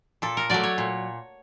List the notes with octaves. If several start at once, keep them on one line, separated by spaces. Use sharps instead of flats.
A#2 A4
A#4
F#3 A3 D5
C#5
A#2